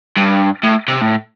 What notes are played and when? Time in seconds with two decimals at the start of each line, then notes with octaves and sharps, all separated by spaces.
0.17 G2
0.64 A2
0.88 C3
1.01 A2